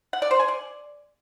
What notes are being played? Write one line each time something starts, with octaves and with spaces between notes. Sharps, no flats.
F#5
D5
C5
G#5
D5